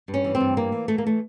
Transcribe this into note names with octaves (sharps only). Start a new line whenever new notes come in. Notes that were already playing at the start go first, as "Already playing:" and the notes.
G2
C#4
E3
C4
G2
E3 A#3
E3
E3 A3
A#3
A3